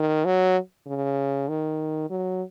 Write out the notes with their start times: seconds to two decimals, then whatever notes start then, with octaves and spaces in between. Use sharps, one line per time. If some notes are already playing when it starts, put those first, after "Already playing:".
Already playing: D#3
0.25 F#3
0.87 C#3
1.49 D#3
2.10 F#3